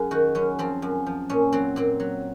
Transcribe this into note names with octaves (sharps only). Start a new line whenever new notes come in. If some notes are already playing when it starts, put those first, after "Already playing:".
Already playing: F#2 F#3 G#4
D#3 F#4
F#2 C#4
F3 C4
F#2
F3
A#2 C#4
F#3 C4
A#2 C4
F#3